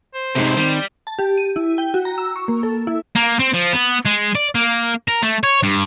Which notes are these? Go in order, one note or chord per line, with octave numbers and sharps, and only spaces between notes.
C5
F#2 A2 C3 G#3 D#4
D#3 G3 C4
A5
G4
D#7
E4
G5
F#4
A#5
E6
C#6
A#3
A4
E4
A#3
C4
F3
B3
G#3
D5
A#3
A#4
A3
C#5
G2